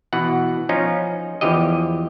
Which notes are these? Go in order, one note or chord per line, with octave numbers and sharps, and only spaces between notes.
B2 E3 F#5
F3 C#4 D#4 F4
E2 E3 F3 G4 D#5